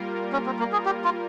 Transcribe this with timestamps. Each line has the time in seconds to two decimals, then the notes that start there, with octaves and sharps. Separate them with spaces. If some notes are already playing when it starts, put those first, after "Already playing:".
Already playing: G3 A#3 F4 A#4
0.33 C#4
0.46 C4
0.59 A#3
0.73 G#4
0.86 G4
1.04 F4